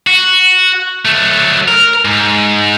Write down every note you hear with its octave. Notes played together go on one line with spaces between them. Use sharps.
F#4
F#3 A3
A#4
G#2